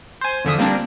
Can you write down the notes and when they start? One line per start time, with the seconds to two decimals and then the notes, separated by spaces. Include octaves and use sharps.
0.21 C5 G#5
0.45 E2 D3 F3 E5 D#6
0.58 F3 G3 A#3 C4 D4